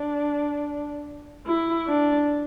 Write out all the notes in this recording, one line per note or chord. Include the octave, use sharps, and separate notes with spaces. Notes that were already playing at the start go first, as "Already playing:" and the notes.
Already playing: D4
E4
D4